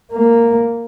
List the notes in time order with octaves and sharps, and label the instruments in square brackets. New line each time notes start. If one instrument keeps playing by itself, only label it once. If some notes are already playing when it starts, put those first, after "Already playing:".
[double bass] A#3